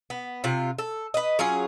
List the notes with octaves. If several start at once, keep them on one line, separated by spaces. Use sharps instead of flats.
B3
C3 F4
A4
B4 D#5
F#3 C#4 F4 G#4